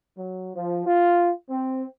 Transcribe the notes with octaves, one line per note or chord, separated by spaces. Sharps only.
F#3
F3
F4
C4